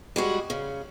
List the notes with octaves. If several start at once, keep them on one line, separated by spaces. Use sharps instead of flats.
G3 G#3 F#4 G#4
C#3